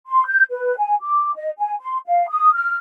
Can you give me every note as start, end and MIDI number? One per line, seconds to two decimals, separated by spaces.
0.07 0.24 84
0.27 0.43 91
0.51 0.75 71
0.78 0.95 80
1.01 1.34 86
1.35 1.50 75
1.59 1.75 80
1.81 1.99 84
2.07 2.26 77
2.29 2.50 87
2.54 2.77 89